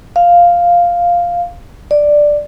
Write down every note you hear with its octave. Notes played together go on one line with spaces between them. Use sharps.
F5
D5